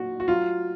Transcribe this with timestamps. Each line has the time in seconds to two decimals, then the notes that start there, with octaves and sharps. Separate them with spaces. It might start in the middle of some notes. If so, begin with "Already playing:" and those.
Already playing: A#2 F#3 F#4
0.20 F#4
0.28 F#3 F4